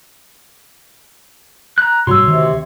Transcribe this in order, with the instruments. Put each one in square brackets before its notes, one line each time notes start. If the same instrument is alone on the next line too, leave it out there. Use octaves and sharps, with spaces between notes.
[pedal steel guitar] A#5 F#6
[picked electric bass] G#2 B2 G3 [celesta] F#4 E6 [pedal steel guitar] C#5 C6
[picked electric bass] D2 D#3 [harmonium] C3